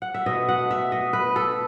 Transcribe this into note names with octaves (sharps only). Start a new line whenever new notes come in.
F#5
E5
B2 A3 D#5
F#5
E5
D#5
B4
A4